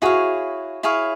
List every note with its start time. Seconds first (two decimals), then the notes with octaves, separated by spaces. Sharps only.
0.02 E4 F#4 G#4 C#5 F5
0.83 E4 G#4 C#5 F5